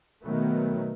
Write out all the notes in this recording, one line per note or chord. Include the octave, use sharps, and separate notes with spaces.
B2 D#3 F#3 A3 B3